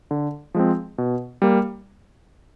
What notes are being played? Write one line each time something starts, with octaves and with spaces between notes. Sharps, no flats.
D3
F3 G#3 C4
B2
G3 A#3